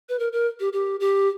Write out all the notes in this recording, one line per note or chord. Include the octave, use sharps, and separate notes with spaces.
B4
A#4
A#4
G4
G4
G4